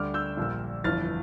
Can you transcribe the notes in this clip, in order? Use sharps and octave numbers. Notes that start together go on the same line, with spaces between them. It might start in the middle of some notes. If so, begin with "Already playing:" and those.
Already playing: D2 D3 G3 D6 F6
E6 G6
A#1 A#2 G3
G1 F2 E3 F6 A6